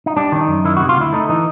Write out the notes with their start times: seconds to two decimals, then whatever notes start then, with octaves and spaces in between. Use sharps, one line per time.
0.06 D#4
0.16 G3 D4
0.32 D#3 D4
0.41 D#4
0.48 F#2
0.65 D#3 E4
0.77 C3 F#4
0.89 F4
0.97 D2 E4
1.13 A3 D#4
1.29 E3 D#4